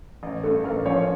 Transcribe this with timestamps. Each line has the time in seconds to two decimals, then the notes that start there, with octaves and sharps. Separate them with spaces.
0.23 A1
0.44 G2 A3 A4
0.60 A4
0.64 A1 A#3 A#4
0.86 F3 C#4 C#5